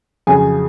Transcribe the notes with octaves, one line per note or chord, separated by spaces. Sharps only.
F2 C#3 F#3 G#4 G#5